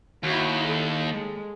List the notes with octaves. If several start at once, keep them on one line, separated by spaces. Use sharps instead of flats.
D#2 E4 F#4
A4
G#3